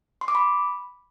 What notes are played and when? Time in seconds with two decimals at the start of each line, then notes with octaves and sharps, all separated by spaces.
0.21 C6
0.28 D6
0.35 B5